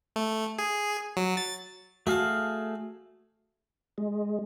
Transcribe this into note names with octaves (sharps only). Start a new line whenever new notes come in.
A3
G#4
F#3
A6
A3 F#4 G#4 F5 A5
G#3